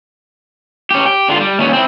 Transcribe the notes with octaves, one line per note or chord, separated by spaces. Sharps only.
C#4 G4
G4
D3 F4
G3
D#2 C#4
C4 E4